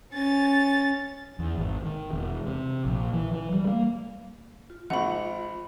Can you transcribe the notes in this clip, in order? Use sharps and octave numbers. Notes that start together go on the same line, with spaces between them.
C#4 A6
E2
G#1
D#3
E1
C3
A#1
E3
E3
G3
A#3
F4
G#1 F#5 B5